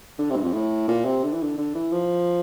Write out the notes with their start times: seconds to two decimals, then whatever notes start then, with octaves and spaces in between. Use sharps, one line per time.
0.18 D3
0.30 C3
0.36 G2
0.42 F2
0.53 A2
0.88 A#2
1.05 C3
1.23 D3
1.32 E3
1.42 D3
1.58 D3
1.75 E3
1.91 F3